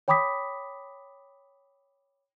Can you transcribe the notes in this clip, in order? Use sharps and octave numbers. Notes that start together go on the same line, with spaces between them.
C#5 G5 B5 D6 D#6 B6